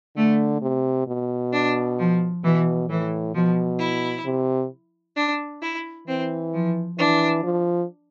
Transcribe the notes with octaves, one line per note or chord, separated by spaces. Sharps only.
D3 A3
C3
B2
D4
F3
B2 E3
A2 E3
B2 F3
E4
C3
D4
E4
E3 C4
F3
E3 D4
F3